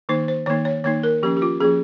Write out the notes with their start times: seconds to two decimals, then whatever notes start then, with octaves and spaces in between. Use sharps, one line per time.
0.09 D#3 A#3 D#4 C5
0.28 C5
0.46 D#3 A#3 D#4 C#5
0.65 C#5
0.84 D#3 A#3 D#4 C#5
1.03 A#4
1.23 F3 A#3 C#4 G4
1.37 G4
1.42 F4
1.60 F3 A#3 C#4 G#4